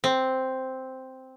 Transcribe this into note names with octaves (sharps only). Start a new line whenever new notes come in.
C4